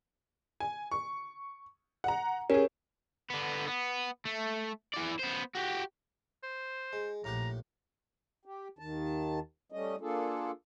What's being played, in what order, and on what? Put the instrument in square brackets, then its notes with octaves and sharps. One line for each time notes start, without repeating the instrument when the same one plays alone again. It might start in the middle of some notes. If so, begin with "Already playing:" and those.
[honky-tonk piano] G#5
C#6
F#5 A#5
[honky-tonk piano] C#4 G#4 [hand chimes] G4 A#4 C#5
[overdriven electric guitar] D3 B3
B3
A3
E3 D5
B3 C5
F#4 G4
[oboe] C5
[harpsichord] G#3
[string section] A#1 [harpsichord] A2 G4 F#5 [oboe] A#5
[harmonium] G4
D#2 D#3 A5
G3 A3 C#4 D#5
A#3 D4 F4 G#4 A4